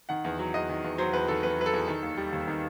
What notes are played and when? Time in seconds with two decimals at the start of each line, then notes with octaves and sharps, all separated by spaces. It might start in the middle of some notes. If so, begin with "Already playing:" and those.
0.09 D#3 F#5
0.24 E2
0.39 F#3
0.54 E2 D#5
0.69 D#3
0.84 E2
0.98 F#3 C5
1.13 E2 B4
1.28 D#3 A4
1.43 E2 B4
1.58 F#3 B4
1.66 A4
1.73 E2
1.88 D#3
2.03 D#2
2.17 G3
2.32 D#2
2.47 D#3